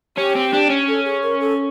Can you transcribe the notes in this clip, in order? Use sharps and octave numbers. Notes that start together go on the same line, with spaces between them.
C#4 G4
C4
D4
C#4
A4
G#4
A#4
A4